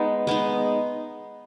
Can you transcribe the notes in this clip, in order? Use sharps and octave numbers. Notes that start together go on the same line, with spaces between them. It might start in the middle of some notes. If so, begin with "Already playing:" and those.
Already playing: G#3 B3 D#4
G#3 B3 D#4